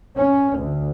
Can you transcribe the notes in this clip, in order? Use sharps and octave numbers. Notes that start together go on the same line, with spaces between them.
C#4
D2